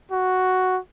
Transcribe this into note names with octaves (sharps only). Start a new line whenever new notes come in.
F#4